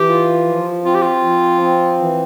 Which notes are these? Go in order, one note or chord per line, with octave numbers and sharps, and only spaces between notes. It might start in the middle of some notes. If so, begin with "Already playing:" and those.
Already playing: E3 G4
F4
F3
C4 F4
G4
F4
F3
C4
E3